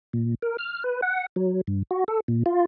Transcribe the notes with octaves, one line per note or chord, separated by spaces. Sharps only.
A#2
A#4
F6
B4
F#5
F#3
G2
F#4
A4
A#2
F4